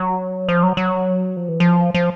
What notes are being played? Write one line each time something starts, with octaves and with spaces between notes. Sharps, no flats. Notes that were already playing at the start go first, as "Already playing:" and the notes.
Already playing: F#3
F3
F#3
F#3
F3
E3
F3
F3